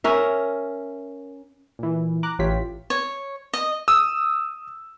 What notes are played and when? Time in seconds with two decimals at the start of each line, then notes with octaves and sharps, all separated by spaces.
0.04 C#4 A#4 E5
1.79 A#2 E3
2.23 A#5 D6 F#6
2.39 A1 E3 F4 G4 C#5 B6
2.90 C#5
3.54 D#5
3.88 D#6 E6